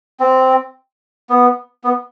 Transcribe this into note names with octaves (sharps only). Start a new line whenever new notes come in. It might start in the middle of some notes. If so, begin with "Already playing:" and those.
C4
B3
B3